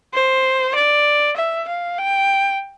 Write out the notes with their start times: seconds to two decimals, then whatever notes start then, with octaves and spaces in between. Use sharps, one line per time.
0.14 C5
0.75 D5
1.37 E5
1.68 F5
1.98 G5